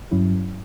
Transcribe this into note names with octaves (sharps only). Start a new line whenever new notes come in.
G2 F#3 C#4 E4